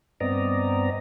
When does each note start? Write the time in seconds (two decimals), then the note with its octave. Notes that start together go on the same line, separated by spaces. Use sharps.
0.20 G2 B3 C4 D5 D#5 A#5